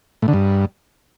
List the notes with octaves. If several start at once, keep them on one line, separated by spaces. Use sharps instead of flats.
A2
D3
G2